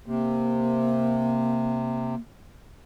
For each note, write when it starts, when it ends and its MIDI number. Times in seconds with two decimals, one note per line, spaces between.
0.06 2.15 48
0.06 2.19 58